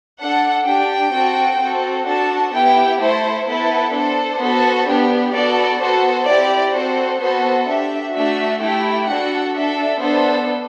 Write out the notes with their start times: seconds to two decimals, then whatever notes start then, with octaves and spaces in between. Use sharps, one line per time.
0.19 D4 A4 F#5
0.65 D4 G4 G5
1.12 C4 F#4 A4
1.59 C4 F#4 A4
2.06 D4 F#4 A4 A5
2.53 B3 E4 G4 G5
2.99 A3 E4 A4 C5
3.46 B3 E4 A4 B4
3.92 D4 A4 C5
4.39 B3 F#4 A4
4.87 B3 D4 G4
5.33 B3 F#4 A4 D5
5.79 B3 F#4 A4 C5
6.26 C4 E4 G4 D5
6.73 C4 F#4 A4 C5
7.20 B3 F#4 A4 C5
7.66 D4 G4 E5
8.12 A3 D4 F#4 E5
8.59 A3 E4 G4 G5
9.06 D4 F#4 A4 F#5
9.53 D4 A4 E5
10.00 B3 D4 A4 C5